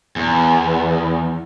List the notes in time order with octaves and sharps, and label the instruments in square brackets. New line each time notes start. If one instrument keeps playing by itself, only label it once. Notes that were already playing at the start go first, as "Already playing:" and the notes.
[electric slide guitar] E2